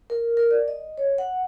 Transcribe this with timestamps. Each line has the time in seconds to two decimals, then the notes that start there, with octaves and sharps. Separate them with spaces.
0.10 A#4
0.37 A#4
0.51 D5
0.68 D#5
0.98 C#5
1.18 F#5